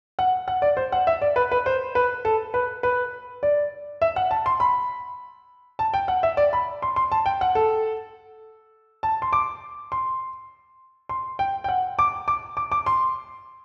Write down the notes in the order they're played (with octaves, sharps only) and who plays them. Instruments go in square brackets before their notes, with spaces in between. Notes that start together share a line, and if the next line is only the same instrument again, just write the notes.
[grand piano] F#5
F#5
D5
C5
F#5
E5
D5
B4
B4
C5
B4
A4
B4
B4
D5
E5
F#5
A5
C6
B5
A5
G5
F#5
E5
D5
B5
C6
C6
A5
G5
F#5
A4
A5
C6
D6
C6
C6
G5
G5
F#5
D6
D6
D6
D6
C6